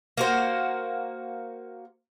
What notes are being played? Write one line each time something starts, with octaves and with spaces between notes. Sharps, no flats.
A#3 F#4 C5